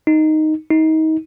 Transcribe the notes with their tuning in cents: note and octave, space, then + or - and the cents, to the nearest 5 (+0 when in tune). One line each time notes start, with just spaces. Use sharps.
D#4 +0
D#4 +30